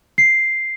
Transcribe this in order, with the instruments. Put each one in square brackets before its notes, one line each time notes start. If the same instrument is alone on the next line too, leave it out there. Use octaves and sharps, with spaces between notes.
[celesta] C7